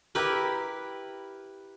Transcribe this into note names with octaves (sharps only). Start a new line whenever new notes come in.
E4 G4 A#4 B4